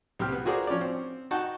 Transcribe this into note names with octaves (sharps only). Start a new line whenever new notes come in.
C2 C4 G4 F6
B3
F4 F#4 G#4 A#4 C5 D5
F3 C#4 C#5 D5
C4
D#4 F#4 F#5 G5 A5 C#6